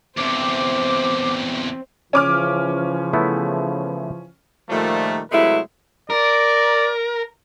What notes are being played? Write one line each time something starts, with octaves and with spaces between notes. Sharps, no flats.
E2 C3 C4 C5 D6
C#3 E3 F3 C#4 D6 F6
A3 B3 E4
A#2 D#3 F3 G3 A3
C3 F#3 G#3 A3 E4 B4
A#4 D5